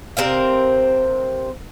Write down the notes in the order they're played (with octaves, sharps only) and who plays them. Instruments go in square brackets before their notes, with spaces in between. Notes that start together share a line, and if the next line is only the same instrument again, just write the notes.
[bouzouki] C3 C4 A#4 F5